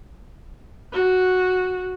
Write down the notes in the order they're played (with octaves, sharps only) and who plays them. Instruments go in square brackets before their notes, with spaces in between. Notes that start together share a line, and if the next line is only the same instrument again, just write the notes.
[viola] F#4